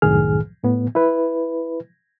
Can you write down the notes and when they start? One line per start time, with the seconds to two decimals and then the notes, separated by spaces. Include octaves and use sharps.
0.02 C2 F#2 A2 D#3 G#4 F6
0.63 A2 B3
0.95 E4 B4